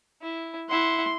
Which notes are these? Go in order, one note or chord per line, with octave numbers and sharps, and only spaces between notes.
E4
E4 F#5 C6